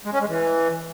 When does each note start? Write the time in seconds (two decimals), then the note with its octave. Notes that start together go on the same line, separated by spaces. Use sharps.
0.05 G#3
0.13 C#4
0.21 G#3
0.28 E3